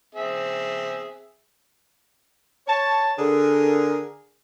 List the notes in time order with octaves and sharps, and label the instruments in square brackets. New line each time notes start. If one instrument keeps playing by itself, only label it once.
[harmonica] C4 G#4 E5
[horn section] C#5 A5
D3 G#4 A#4